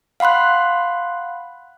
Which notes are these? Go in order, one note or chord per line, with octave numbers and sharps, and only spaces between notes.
F5 F#5 B5 C6 F#6